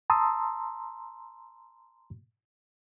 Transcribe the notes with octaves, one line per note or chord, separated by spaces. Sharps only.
A5 A#5 C6 D#6 E6